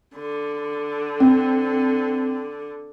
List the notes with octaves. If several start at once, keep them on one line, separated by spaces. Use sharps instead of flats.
D3
C4